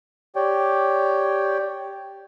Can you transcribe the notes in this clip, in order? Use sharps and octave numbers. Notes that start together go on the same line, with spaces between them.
G4 C#5 D5 G5